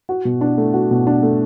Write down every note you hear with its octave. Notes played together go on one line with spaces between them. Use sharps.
F#4
B2
D4
A3
F#4
B2
D4
A3